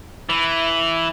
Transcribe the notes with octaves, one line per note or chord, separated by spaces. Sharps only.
E3